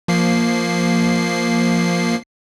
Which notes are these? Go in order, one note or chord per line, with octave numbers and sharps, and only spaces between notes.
F3 A#3 C7